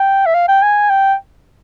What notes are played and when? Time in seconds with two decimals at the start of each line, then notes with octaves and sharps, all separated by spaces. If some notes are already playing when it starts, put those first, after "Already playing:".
Already playing: G5
0.26 E5
0.34 F5
0.48 G5
0.62 G#5
0.90 G5